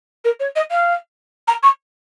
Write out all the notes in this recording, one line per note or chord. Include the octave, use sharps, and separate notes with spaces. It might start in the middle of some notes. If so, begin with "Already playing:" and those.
A#4
C#5
D#5
F5
A#5
C#6